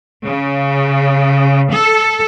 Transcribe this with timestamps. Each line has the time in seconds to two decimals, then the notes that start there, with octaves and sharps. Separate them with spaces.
0.25 C#3
1.72 A4